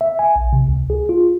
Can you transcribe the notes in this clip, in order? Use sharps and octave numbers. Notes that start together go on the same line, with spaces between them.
E5
G#5
A#1
C3
C#2
G#4
F4